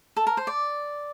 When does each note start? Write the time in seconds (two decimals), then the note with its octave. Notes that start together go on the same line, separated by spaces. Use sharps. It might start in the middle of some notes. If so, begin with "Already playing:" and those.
0.17 A4
0.27 A#4
0.37 C5
0.47 D5